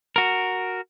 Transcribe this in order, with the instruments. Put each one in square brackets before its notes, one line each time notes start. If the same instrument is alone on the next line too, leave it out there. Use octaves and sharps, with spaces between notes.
[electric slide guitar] F#4 A#4